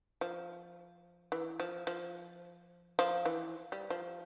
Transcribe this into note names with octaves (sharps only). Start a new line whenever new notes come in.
F3
E3
F3
F3
F3
E3
G3
F3